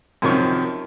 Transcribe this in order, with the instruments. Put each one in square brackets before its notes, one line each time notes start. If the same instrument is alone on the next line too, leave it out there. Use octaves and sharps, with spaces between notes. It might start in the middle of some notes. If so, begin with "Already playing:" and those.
[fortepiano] F#2 C3 D#3 F3 C#6